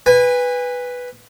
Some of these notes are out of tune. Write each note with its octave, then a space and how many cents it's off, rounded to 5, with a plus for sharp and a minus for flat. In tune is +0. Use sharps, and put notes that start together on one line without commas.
B4 +0 G#5 -35